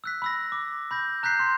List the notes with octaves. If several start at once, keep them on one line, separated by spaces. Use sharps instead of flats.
E6 F#6 B6
B5 E6 A#6
D6
B5 G6 A#6
A#5 F#6 G6 B6 C7
C6